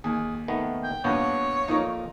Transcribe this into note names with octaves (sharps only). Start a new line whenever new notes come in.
D#2 G#4
D#3 A3 B3
G5
A#1 G2 B3 C#5
F2 A#2 A#3 D#4